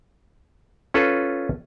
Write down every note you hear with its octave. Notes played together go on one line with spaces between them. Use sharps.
C#4 F4 A4 B4